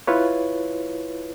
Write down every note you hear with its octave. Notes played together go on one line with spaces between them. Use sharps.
E4 F4 B4 C#5